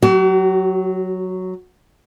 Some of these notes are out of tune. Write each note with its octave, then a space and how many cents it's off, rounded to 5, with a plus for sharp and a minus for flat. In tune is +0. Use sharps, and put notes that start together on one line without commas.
F#3 +0 F#4 +45